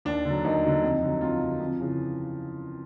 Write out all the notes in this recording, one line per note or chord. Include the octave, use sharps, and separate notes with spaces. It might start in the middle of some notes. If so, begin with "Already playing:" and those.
D#2 D4
D3 F#3
D#2 D#4
D3 F#3
F2
D3 F#3
F2 F4
D3 F#3
F2
C#3 E3